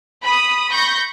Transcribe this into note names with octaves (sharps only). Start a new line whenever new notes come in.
B5 D#6
B5 C#6 G6 A#6